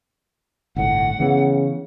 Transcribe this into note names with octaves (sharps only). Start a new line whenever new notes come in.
G1 C2 A2 F#5
C#3 E3 B3